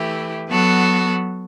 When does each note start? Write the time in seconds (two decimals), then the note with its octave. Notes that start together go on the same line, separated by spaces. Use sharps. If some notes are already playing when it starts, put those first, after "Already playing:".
Already playing: E3 A3 E4 G4
0.48 F#3 B3 F#4 A4